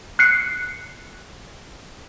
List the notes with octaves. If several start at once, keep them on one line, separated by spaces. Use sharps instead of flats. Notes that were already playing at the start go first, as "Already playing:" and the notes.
F#6 C7 C#7